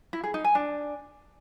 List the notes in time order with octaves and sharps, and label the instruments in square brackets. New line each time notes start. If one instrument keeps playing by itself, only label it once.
[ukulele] E4
G#4
D#4
G#5
D4